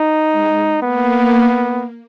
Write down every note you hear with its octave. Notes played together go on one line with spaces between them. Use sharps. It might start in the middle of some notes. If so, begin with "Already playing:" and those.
Already playing: D#4
G#3
A#3 B3